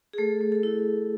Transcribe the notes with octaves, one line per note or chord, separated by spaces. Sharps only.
G#4
A3 A4
A3
A4
E4